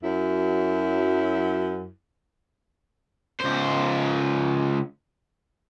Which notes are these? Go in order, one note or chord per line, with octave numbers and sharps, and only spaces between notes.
F#2 F#3 E4
C#2 C5